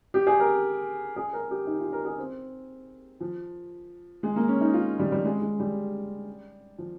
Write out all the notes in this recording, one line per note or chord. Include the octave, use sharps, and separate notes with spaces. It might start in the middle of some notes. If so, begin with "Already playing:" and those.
G4
G#4
A#4
G#4
A#4
G4
D#4
F4
A#4
G#4
C4
F3
G#3
A#3
C#4
D#4
F4
G3
G3
G#3
G#3
G3
F3